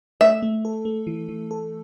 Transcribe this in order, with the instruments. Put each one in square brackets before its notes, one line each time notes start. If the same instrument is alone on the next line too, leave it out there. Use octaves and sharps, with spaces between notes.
[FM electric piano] A3 [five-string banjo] E5
[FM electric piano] A3
A4
A3
E3
E3
A4